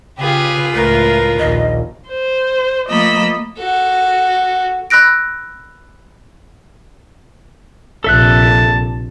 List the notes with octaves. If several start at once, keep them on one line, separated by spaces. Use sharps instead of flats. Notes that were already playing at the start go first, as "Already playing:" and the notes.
C#3 F4 G4 G#4 B4
C#2 A2 A3 A#4
A#1 D#2 D#5
C5
F3 A3 A#3 D#5 B5 E6
F#4 A4
B5 E6 F#6 A#6 D7
A#1 C3 A4 E5 A5 F#6